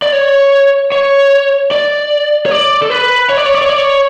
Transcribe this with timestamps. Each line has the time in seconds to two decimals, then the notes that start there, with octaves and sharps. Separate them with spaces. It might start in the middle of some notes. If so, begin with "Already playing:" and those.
0.02 D5
0.13 C#5
0.92 C#5
1.71 D5
2.46 C#5
2.51 D5
2.82 A4
2.90 B4
3.29 C#5
3.37 D5
3.46 C#5
3.54 D5
3.62 C#5
3.69 D5
3.78 C#5